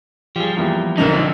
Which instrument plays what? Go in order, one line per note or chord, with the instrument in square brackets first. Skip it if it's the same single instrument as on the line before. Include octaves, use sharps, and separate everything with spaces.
[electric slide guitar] F3 G3 [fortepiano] G4 G#4
[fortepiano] E2 A#3 G4
[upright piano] B1 A#4 F7 [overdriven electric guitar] F2 D3 [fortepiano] G#2
[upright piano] C4 D#4